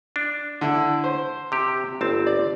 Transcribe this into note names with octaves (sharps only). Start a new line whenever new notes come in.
D4
D3 E4
C5
C3 G4
G1 C4 A5
D5